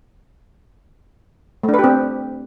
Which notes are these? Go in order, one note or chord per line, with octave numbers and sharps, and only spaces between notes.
A3
D4
B4
G4
C4